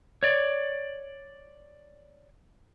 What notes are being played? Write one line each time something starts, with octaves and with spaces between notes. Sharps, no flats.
C#5 D5